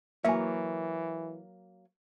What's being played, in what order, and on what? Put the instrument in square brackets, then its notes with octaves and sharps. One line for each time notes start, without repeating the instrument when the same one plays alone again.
[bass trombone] E3 [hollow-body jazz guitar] F#3 A#3 C#5 [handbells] E5 G#5